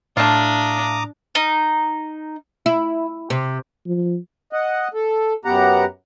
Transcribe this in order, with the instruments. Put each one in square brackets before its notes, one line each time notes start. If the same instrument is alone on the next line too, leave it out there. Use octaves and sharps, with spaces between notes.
[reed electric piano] A2 [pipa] A3 F4 [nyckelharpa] D4 [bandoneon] A#5 D6 D#6
[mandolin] D#4
[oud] E4
C3
[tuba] F3
[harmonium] D#5 F#5
A4
F#2 B3 G4 F#5 A#5